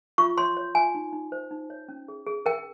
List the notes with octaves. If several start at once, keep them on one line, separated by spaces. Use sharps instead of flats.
F4 C#6
C#5 C6
C#5
F4 G#5
D#4
D#4
C5
D#4
C#5
C#4
G#4
G#4
A#4 G5